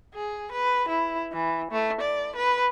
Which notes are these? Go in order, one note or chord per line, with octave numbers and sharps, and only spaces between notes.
G#4
B4
E4
E3
A3
D5
B4